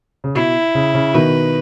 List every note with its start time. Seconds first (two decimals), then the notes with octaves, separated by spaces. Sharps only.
0.24 C#3
0.35 B2 E4
0.75 C#3
0.95 C#3
1.14 B2 D#3 B4